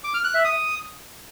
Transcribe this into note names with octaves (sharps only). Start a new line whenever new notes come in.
D6
F6
F#6
E5
D#6